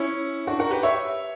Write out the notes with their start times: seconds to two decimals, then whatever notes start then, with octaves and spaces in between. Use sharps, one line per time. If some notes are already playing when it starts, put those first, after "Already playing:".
Already playing: C#4 E4
0.47 D4 F#4
0.59 F#4 A#4
0.71 G4 B4
0.83 C#5 E5